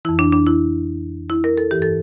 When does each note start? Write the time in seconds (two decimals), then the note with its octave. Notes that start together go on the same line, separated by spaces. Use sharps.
0.05 E3 E4
0.09 F2
0.19 D4
0.33 D4
0.47 E4
1.30 E4
1.44 A#4
1.58 A4
1.71 G2 E3 G4
1.82 A4